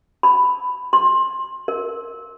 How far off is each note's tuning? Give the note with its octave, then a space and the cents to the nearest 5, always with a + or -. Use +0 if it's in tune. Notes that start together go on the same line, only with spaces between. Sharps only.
B5 +10
C6 +20
A#4 +5